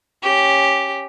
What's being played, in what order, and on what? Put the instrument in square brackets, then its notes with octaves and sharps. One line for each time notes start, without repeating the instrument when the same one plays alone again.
[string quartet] C#4 G4